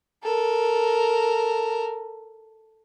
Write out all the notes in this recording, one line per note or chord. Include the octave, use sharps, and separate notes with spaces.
A4 A#4